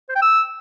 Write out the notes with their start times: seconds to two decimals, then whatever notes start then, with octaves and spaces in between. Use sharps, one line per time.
0.09 C5
0.16 G5
0.22 E6